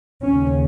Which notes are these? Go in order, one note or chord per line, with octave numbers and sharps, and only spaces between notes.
D#2 C#3 C#4